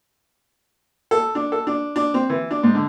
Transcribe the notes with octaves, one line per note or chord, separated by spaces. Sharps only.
A4
D4
A4
D4
D4
C4
E3
D4
G#2
D3